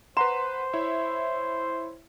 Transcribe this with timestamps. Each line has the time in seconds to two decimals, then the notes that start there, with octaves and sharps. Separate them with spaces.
0.17 B4 C5 F#5 A#5 C6 E7
0.73 E4 C#5 E5